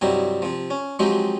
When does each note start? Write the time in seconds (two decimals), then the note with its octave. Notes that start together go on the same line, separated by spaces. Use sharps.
0.01 G2 C3 F#3 G3 D#4 E4
0.42 C3 F3
0.70 C#4
0.99 F3 F#3 G#3 C4 D#4 G4